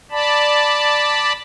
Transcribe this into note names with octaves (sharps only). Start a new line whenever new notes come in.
D5 A5 B5